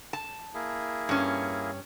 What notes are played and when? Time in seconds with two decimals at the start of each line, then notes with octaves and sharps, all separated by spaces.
0.13 A5
0.54 A#3 E4 G#4
1.09 G2 C#4